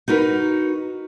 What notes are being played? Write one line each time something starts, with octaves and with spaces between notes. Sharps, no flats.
D#4 F#4 A#4 B4